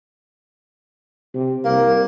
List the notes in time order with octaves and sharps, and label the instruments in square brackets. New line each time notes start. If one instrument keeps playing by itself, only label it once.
[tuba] C3
[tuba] C2 [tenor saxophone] A#3